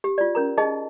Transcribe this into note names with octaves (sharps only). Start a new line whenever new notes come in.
G4
F4 D5
C#4 A#4 A#5
D#4 G#4 D#5 A5